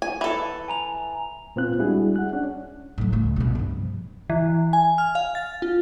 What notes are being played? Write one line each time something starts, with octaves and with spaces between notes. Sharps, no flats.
G#5
E3 A4
G#5 A#5 F7
A#2 B3 C4 F4 F#6
G3 G#3 D4 E4 F#4 G#4
F#5 F#6
C#4 D4
A2 F#3
C#2 A3
C2 B2
G2 F3
E3
G#5
F6
F5
A6
F4